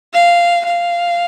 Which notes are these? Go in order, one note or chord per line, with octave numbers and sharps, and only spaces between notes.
F5
F5